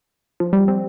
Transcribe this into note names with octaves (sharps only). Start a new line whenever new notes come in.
F3
G3
C4